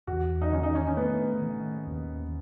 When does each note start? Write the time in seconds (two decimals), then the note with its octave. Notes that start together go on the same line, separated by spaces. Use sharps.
0.07 E2 F#4
0.42 D#4
0.52 D#3 C#4
0.63 D#4
0.75 C#4
0.87 C#4
0.97 A3 B3
1.42 D#3
1.87 D#2